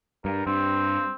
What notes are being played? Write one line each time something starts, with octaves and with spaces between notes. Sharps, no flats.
G2 A#4
G2 C4